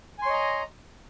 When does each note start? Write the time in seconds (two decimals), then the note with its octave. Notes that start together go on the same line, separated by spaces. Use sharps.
0.18 G#5
0.22 C6
0.26 C#5
0.29 D#5
0.33 A#5